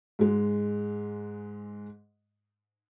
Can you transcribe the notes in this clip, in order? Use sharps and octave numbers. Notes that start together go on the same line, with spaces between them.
G#2 G#3